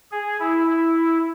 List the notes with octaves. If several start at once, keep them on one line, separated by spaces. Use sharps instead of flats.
G#4
E4
E4